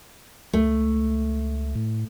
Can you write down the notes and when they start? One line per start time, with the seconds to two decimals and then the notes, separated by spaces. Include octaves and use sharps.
0.53 C#2 A3
1.75 A2